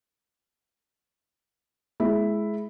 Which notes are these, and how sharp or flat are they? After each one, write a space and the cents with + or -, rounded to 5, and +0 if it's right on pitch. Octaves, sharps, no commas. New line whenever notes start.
G#3 +25 E4 +0